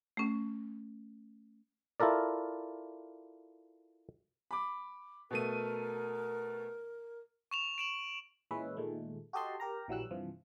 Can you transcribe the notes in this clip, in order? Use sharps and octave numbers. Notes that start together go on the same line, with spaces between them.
A3 C#4
E4 F4 A4 A#4 D5
B5 D6
B2 A3 A#4 D#7
C#6 E7 F7
D7 E7 F#7
A#2 E3 G#3 C#4 B4 E5
A#2 D#3 G#3 A3
F#4 G4 A4 D#5 A5 C6
G4 A#4 A#5
A#1 E3 F#3 G3 E6 F#6
G2 C3 E3 F3